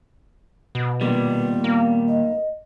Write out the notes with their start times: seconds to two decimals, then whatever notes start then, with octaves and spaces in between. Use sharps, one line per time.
0.75 B2
1.01 A#2 D#3 G3 B3
1.64 A#3
2.07 D#5